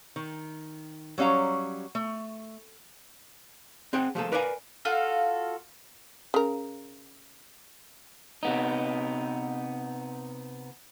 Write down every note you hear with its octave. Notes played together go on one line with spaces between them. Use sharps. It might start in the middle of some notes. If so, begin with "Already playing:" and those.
D#3
F#3 G3 C#4 F5 A#5
A3
C4 G#4 F#5 G5
F3 G3 A3 A#3 G#4 A4
A#4 B4 D5 F5 F#5 G#5
F4 F#4 A4 F5
C#3 A#4
C3 B3 D#4